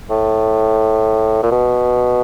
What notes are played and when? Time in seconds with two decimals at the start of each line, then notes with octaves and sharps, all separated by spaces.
0.10 A2
1.43 A#2
1.51 B2